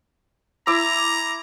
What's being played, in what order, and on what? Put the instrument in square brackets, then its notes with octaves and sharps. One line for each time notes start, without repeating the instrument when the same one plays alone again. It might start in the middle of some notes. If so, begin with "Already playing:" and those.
[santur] E4 D6 E6 [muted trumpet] A#5